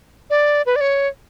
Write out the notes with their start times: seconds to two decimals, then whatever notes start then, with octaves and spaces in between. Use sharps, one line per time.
0.30 D5
0.66 B4
0.76 D5
0.81 C#5